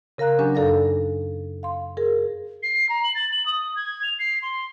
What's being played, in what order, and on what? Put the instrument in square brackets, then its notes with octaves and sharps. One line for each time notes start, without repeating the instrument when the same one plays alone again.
[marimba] C#3 A#4 F5 A#5 F#6
F#3 C#4 D4 G4 G#5
F#2 D#4 A4 D5 F5 A#6
F5 C6
G#4 A#4
[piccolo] C7
A#5
F#7
A6
F#7
D#6
G#6
F7
C7
C6